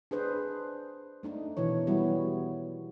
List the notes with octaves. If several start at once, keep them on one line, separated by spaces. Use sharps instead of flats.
D4 G#4 B4 C5
A3 D4 D#4
B2 D#3 E3 C#5
F#3 G3 B3 E4 F#4